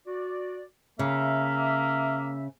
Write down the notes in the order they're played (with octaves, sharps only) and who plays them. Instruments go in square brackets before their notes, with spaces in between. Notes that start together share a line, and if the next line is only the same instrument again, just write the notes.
[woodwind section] F#4 D5
[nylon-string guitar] C#3 [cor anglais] A#3 [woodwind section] E5